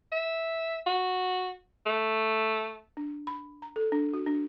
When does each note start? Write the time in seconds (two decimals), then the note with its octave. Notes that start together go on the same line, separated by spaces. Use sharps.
0.12 E5
0.86 F#4
1.86 A3
2.97 D4
3.27 B5
3.62 A#5
3.76 A4
3.92 D4
4.14 F#4
4.26 D4